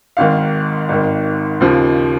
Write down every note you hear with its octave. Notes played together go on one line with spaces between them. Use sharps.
G#1 G#2 D#3 F5
G#1 G#2 D#3
D#2 C#3 F3